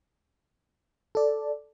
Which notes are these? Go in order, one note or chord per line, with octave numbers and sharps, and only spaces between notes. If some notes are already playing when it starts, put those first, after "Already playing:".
A4 D5